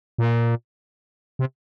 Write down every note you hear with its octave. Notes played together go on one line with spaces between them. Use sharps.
A#2
C3